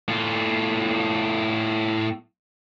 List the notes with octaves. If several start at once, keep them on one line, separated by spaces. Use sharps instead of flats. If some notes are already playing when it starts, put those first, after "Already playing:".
A2 F4